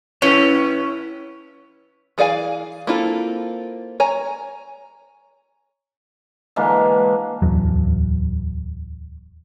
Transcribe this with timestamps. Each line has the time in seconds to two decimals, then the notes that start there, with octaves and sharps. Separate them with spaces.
0.22 C#4 E4 B4 C#5
2.18 E3 G#4 D5 F5 G#5
2.87 A#3 C4 E4 F4 A4
4.00 C#5 G#5 A#5
6.56 D3 E3 G#3 A#3
7.42 D1 E2 F#3